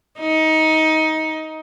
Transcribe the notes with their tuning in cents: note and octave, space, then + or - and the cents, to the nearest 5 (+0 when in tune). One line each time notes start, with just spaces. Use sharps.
D#4 +20